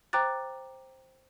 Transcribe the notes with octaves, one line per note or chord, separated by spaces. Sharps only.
C5 G5 A#5 D6 F#6 A6